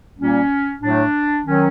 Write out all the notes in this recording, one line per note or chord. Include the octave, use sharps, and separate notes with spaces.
A#2 G3 A#3 C#4
A2 F#3 A3 D4
D#3 F#3 C#4